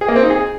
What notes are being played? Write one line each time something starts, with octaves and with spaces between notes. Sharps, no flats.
G#4
A#3
C4
D#4
G#4